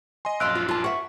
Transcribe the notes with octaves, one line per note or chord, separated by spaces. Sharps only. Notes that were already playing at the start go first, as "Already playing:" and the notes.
D#5 G#5 C6
A#1 F#2 D#5 F5 C6 E6 F#6 D7
F4
A#3 F4 A5
E5 F#5 C#6